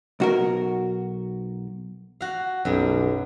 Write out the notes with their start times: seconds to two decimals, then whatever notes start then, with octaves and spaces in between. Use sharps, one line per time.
0.20 B1 F#4 A#4
2.21 F#4 F5
2.65 B1 F#2 G3 G#4